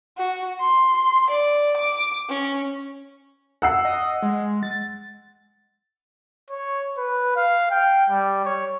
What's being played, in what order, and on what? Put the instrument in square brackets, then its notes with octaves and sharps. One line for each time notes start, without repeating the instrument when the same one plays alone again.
[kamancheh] F#4
C6
D5
D6
C#4
[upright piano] F#5 E6 C7
[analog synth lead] D#5
G#3
A6
[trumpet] C#5
B4
F5
G5
G3
C#5